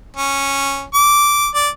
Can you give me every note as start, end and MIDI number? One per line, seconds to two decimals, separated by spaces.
0.17 0.84 61
0.94 1.48 86
1.54 1.69 74